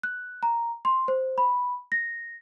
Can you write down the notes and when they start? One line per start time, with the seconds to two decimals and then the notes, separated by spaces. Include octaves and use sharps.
0.03 F#6
0.43 A#5
0.85 C6
1.08 C5
1.38 B5
1.92 A#6